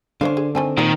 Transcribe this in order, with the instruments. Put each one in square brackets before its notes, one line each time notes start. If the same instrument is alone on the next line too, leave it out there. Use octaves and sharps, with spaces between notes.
[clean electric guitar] D3 [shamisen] C#4 E4 F5 [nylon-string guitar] D4 C5
[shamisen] G#4
[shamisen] D#3 G#5 A5 [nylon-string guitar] C4
[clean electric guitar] A#2 [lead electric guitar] D#3 [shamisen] E3 A#4 C#5